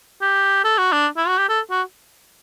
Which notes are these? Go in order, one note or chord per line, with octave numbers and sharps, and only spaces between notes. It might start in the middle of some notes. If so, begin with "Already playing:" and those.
G4
A4
F#4
D4
E4
F#4
G4
A4
F#4